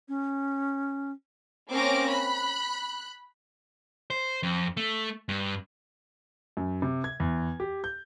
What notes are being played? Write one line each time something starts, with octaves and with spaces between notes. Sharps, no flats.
C#4
A#3 C4 C#4 D6 F6 A#6
B5 F#6
C5
F2
A3
G2
F#2
C3
G#6
E2
G4
G6